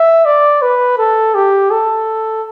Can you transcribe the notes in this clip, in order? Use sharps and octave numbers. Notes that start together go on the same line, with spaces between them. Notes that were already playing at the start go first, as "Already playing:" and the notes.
Already playing: E5
D5
B4
A4
G4
A4